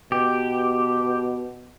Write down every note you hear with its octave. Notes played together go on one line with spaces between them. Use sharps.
B2 G4